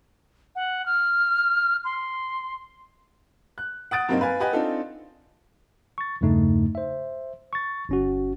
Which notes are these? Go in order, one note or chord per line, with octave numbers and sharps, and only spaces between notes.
F#5
F6
C6
F#6
F#5 D#6 A6 D7
G2 C3 F#3 A#3 C4 D#4
B4 F5 G#5
G4 B4 D#5 F#5 G#5
C4 D4 D#4 F4 A4
C#6 A6
E2 G2 C#3 A3 D#4
C5 E5
C#6 A6
G1 C#4 F#4